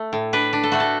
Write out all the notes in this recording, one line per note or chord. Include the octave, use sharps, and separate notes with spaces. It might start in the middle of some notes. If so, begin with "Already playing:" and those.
Already playing: A3
A2
D4 B4
D4
A4
A3 F#4
A4